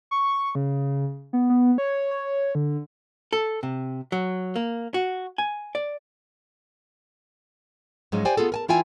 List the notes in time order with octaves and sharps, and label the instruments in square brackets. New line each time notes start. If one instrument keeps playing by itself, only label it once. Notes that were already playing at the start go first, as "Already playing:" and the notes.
[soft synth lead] C#6
C#3
B3
B3
C#5
C#5
D3
[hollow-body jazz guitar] A4
C3
F#3
A#3
F#4
G#5
D5
[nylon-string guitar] G#2 F3 F#3 G#3 C#4
G4 C5 D5 G5 G#5
B3 F4 G#4 A4
A#4 G#5 A5
E3 E4 F4 E5 G5 G#5